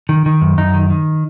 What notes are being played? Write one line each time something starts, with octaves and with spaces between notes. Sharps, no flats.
D#3
D#3
F#2
F#2 D#4
D#3
D#3